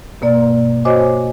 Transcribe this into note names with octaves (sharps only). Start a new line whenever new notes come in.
G2 B2 A#3 D5
F#4 C5 C#5 D#5 G#5 D6